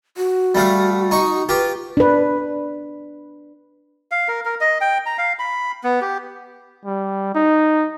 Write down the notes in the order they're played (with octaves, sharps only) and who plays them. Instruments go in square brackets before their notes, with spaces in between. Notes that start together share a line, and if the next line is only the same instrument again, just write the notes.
[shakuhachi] F#4
[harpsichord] G3 A3 F5
D#4 C#6
[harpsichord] F4 G4 [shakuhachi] B4
[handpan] D4 B4
[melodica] F5
A#4
A#4
D#5
G5
A#5
F5
B5
B3
G4
[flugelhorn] G3
D#4